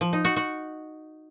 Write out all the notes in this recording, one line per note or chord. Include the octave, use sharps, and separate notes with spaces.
F3
D#4
F#4
F#4